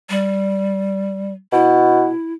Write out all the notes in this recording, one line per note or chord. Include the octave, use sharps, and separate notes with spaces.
G3
B2 E4